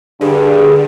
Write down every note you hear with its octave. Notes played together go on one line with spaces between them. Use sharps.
G2 D3 G#4